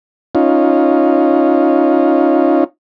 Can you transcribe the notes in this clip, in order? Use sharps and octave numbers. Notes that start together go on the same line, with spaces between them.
C#4 D#4 F4